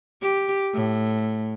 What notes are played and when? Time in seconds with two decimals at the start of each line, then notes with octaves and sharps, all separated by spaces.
0.21 G4
0.74 A2